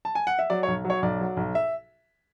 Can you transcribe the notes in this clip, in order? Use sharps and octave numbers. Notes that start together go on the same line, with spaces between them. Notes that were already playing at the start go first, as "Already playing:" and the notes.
A5
G#5
F#5
E5
F#3 D5
C#5
B1
F#3
C#5
B1 D5
F#3
B1
E5